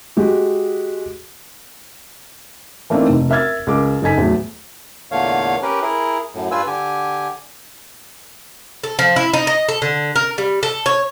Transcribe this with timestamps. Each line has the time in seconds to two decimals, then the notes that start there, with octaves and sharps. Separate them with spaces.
0.17 G#3 F#4 G4
2.90 E3 A3 A#3 C4 D4 D#4
3.09 F1
3.30 A#4 E5 F6 G#6 A6
3.67 C#2 A#4 D6
4.02 F#1 D#4 A4 G#5 B6
4.17 E2 A2 F#3
5.12 E2 A#2 D3 A3 C#5 F5
5.62 C#4 G4 A#4 B4
5.82 E4 G#4 A#4
6.35 F#2 A2
6.51 G2 F4 B4 G#5 E6
6.67 D3 G4 G#5
8.84 A4
8.99 F3
9.16 E4
9.33 D#4
9.47 D#5
9.69 A4
9.82 D3
10.16 A#4
10.38 G3
10.63 A4
10.86 C#5